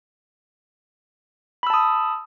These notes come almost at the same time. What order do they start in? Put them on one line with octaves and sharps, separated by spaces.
B5 E6 A5 D#6